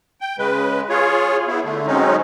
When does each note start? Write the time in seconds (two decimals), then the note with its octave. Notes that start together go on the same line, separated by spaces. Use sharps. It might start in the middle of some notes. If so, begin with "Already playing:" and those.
0.21 G5
0.39 C#3 G#3 B4
0.89 F4 G#4 C#5
1.48 B3 E4
1.64 D3 A3
1.87 F#3 G#3 C4 C#4 D#4